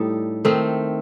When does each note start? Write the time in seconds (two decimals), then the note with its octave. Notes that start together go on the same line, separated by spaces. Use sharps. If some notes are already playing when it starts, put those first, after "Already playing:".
Already playing: A2 G3 D#4 A4
0.45 D#3 A3 C4